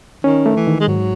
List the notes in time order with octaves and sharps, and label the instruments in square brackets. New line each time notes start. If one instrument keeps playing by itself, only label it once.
[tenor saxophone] D#3 [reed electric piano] C#4
[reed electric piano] A3
[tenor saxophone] E3
[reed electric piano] D#3
[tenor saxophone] G#3
[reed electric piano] G#2 [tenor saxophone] F#3